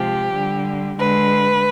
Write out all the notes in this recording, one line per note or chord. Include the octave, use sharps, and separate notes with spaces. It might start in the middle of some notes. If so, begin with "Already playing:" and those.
Already playing: C3 F3 G#3 G4
D3 G3
D3 G#3 B4